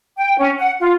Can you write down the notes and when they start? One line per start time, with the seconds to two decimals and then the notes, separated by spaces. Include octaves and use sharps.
0.18 G5
0.38 C#4
0.58 F#5
0.80 F4